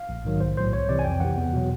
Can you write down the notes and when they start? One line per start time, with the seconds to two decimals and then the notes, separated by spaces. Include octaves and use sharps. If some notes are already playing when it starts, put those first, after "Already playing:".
Already playing: F5
0.09 A#1
0.25 G#2 D#3 F#3
0.40 B1 C5
0.56 A2 F#3 C5
0.73 C2 C#5
0.89 C3 E3 D5
0.99 G#5
1.04 F2 G5
1.20 C3 E3 F#5
1.37 E2
1.53 B2 F#3